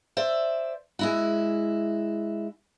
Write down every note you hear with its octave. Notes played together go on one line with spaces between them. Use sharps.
C5 D5 E5
G#3 E4 F#4